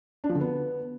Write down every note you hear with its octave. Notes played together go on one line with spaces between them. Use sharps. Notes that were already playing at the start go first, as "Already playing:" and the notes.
D4
F3
D3
B3